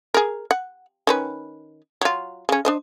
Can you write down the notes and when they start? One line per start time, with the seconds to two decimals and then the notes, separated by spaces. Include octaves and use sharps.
0.14 G#4 A#4
0.51 F#5
1.07 D#3 C#4 B4
2.01 F#3 F4
2.49 C#3 C#4
2.65 D4 C5 D#5